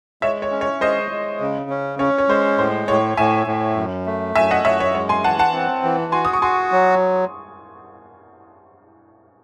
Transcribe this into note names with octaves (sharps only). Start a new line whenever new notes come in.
G#3 C#5 E5
C#5
C#4
C#5
G#3 C5 D#5
G#3
C#3
C#4
C#4 C#5
C#5
G#3 C5
A2 C5
A2 C#5
A2 E5 G#5
A2
F#2
A3
F#2 E5 G#5
D#5 F#5
F#2 C#5 E5
C#5
G#3 C#5
G#5 C6
E3 F#5 A5
F#5 A5
C4
E3
F#4 G#5 C6
D#6
C#6
F#4 G#5 C6
F#3